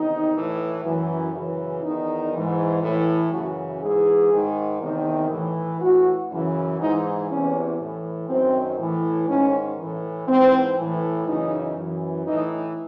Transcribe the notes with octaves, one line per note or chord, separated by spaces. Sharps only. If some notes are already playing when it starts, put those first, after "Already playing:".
Already playing: E2 C3 D#3 D#4
A2 E3
F#2 E3
F#2 C#3 E3
E2 D#3 D#4
G#2 E3
A2 E3
F#2 C#3 E3 F#4
G#2 E3 G#4
G#2 D#3
E2 C3 D#3
A2 E3
A2 E3 F#4
F#2 C#3 E3
G#2 E3 D#4
E2 C3 E3 C#4
A2 E3
F#2 D#3 C4
A2 E3
G#2 D#3 C#4
A2 E3
G#2 E3 C4
A2 E3
F#2 C#3 E3 D#4
F#2 E3
A2 E3 D#4